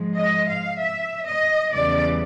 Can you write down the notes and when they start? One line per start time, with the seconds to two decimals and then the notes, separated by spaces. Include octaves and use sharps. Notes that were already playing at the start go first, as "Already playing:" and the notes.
Already playing: G#2 F3 G#3
0.16 D#5
0.48 F5
0.79 E5
1.26 D#5
1.73 E2 C#3 E3 G3 D5